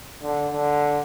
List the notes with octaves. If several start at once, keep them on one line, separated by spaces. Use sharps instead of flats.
D3
D3